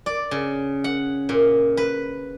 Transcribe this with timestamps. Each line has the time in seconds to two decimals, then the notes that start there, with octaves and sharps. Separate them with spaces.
0.06 D5
0.31 C#3
0.84 F#5
1.29 A#2
1.77 B4